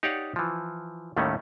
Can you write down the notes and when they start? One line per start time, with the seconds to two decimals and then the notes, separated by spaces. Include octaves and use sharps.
0.03 D#4 G4 C#5 D5 F5 F#5
0.36 E3 F3
1.17 D#2 A2 D#3 G3 A3 C#4